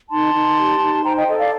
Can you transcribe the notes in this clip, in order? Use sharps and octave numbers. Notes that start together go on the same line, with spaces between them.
D#4 A5 C6
D#4
G4
D#4
C5 G5 A#5
D#5 G5
A4 D#5
D5 F5